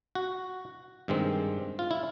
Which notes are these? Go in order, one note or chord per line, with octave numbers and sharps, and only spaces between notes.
F#4
G2 D#3 G#3 C4
F4
E4